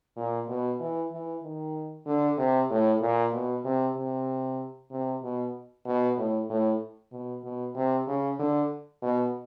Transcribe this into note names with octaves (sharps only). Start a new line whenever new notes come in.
A#2
B2
E3
E3
D#3
D3
C3
A2
A#2
B2
C3
C3
C3
B2
B2
A2
A2
B2
B2
C3
C#3
D3
B2